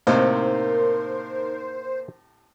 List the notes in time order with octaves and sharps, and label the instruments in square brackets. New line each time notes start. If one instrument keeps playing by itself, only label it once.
[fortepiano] A2 C3 [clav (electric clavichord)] A#3 [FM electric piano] D#4 A#4 [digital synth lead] C5